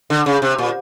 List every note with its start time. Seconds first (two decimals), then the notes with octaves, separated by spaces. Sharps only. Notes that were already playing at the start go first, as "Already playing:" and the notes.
0.10 D3
0.26 C#3
0.42 C3
0.58 A#2